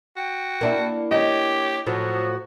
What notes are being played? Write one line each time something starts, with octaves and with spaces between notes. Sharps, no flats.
F#4 G5
A#3 D4 E4
G4 C#5 D#5
A2 F3 F#3 F#4